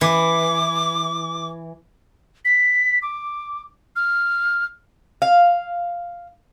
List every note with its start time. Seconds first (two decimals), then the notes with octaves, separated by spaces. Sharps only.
0.01 E3 D6
2.45 B6
3.02 D6
3.96 F6
5.22 F5